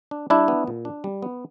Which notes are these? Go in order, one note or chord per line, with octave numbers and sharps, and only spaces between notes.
D4
G3 D4 E4
B3
A#2
D4
G3
B3